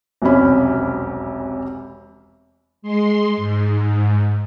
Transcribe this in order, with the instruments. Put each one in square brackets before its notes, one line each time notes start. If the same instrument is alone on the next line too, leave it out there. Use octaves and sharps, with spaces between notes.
[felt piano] E1 B1 F2 C3 C#4 B5
[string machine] G#3 C6
G#2